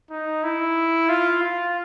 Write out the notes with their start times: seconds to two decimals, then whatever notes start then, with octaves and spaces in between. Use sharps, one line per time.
0.11 D#4
0.44 E4
1.09 F4
1.43 F4